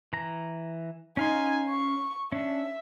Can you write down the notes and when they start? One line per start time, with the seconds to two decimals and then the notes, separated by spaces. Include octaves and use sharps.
0.13 E3 A#5
1.17 C#4 D#4 F5 G#5 C6
1.69 C#6
2.32 C#4 D4 E5